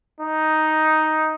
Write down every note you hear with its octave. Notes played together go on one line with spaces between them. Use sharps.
D#4